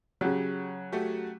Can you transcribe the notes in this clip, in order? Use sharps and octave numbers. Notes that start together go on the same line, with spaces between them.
C#3 F#3 G4
A3 F#4 G4